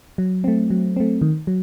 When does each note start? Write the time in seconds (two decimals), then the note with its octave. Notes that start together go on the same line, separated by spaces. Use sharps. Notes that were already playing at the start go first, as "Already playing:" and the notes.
0.18 F#3
0.44 A3 C4
0.70 F#3
0.96 A3 C4
1.21 D#3
1.47 F#3